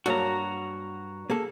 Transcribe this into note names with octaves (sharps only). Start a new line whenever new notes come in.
G2 F#3 A#3 F#4 C#5 A#5
A#3 G#4 A4